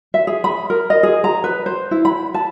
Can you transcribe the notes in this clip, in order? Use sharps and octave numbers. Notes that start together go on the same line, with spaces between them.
E5
G#4
B5
A#4
D#5
G#4
A#5
B4
C5
E4
B5
A5